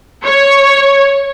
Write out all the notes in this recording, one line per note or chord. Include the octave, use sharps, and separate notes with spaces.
C#5